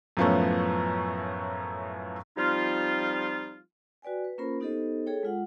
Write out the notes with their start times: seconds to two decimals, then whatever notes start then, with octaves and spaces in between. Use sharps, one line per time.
0.17 F#2 A2 F3 A3 B3 C#4
2.37 F3 G3 C4 D#4 F4
4.02 F#4 B4 D5 G5 G#5
4.24 B4
4.38 A#3 C#4 F4 A#4 C5 B5
4.60 B3 D#4 G4 A4 C5 D#5
5.06 G#4 A4 C#5 G5
5.23 G#3 F4 F#5